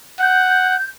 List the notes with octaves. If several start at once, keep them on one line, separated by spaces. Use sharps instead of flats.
F#5 G6